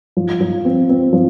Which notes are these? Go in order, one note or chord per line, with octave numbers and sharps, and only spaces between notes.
F3
F3
C4
C4
F3